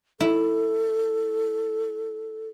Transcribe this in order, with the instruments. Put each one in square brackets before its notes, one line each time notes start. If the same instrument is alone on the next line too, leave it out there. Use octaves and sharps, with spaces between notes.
[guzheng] E4 [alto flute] A4